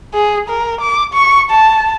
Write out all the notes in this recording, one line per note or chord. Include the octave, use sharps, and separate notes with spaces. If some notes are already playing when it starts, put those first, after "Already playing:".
G#4
A#4
D6
C#6
A5